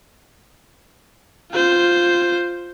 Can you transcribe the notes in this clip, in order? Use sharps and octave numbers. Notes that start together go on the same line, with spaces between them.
F4 C5